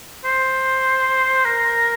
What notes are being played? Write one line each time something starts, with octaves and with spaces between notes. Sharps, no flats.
C5
A#4